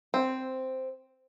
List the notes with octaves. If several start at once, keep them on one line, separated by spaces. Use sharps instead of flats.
C4